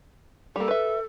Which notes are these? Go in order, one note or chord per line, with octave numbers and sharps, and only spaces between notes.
G3 A#3 A4
B4 E5